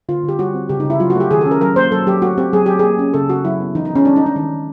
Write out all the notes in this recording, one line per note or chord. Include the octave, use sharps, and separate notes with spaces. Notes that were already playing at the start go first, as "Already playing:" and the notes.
D3 F4
D3 G4
G3 F#4
C4
C#3 G4
D#4
C#3
E4
F#3 F4
F#4
A3
G4
D#3 G#4
A4
C#4
A#4
F#3 A#4
A#3 C5
F#3 A4
F#3 G4
A3 F#4
C4 G4
F#3 G#4
F#3 G4
A#3 G#4
C#4
C#3 A4
C#3 F#4
F#3 E4
B3
E3 D#4
D#4
E3
C#4
G#3 D4
D#4
C#4 D4
D#3 D#4
D#3